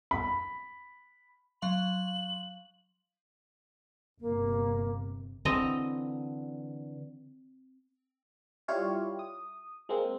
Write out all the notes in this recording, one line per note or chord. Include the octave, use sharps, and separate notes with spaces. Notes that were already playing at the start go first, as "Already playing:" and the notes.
B5
F#3 F5 C6 F#7
G1 C3 A#3
D3 E3 C4 D#5 A#5
G3 E4 F4 G4 C#5 F5
D#6
G#3 A#3 C4